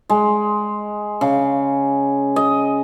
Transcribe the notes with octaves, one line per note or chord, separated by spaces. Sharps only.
G#3
C#3
D#5